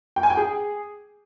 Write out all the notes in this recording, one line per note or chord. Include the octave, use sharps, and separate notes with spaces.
G5
G#5
G5
G#4